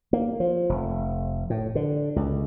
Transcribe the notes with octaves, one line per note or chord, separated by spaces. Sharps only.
A#3
F3
F1
A2
D3
C#2